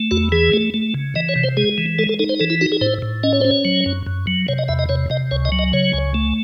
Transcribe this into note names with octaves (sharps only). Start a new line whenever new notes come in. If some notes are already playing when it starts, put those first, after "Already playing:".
Already playing: A3
E2 F#4
E3 G#4
A3
A3
C#3
E3 D#5
C#5
C3
C5
G#3 G#4
E3
G#3 A4
A4
D#4 A4
C5
E3 A4
E4
D#4 F#4
G#4
A2 C5
A2
C#4 D#5
C#5
C#4 C5
C#5
F#3
F#2
F#2
F#3
C3 C#5
D#5
E2 E5
D#5
C3 C#5
C3 D#5
C#2 C#5
D#5
F#3
D#5
C#3 C#5
C#2
A3